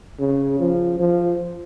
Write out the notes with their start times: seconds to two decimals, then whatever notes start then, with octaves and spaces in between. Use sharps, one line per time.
0.19 C#3
0.59 F3
0.99 F3